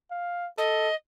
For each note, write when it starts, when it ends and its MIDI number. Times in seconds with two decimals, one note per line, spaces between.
0.11 0.48 77
0.58 0.89 69
0.58 0.95 75